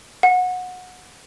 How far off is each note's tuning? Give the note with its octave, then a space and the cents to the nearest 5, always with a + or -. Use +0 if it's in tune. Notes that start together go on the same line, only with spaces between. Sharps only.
F#5 -20